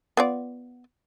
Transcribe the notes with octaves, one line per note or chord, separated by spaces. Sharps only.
B3 F4 D5